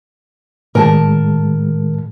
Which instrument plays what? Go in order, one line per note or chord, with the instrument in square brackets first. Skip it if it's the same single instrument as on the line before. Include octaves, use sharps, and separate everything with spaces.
[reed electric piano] A2 D#3 G#3 [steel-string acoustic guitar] A#4 G#5 A5